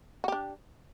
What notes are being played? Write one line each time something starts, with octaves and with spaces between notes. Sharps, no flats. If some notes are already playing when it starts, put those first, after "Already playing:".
D4 F#4 G4